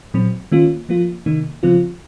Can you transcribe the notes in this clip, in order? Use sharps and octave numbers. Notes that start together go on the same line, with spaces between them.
A#2 F#3 C4
D#3 A#3 C#4 F4
F3 A#3 F4
C3 D#3 A#3 D#4
C#3 F3 C4 F4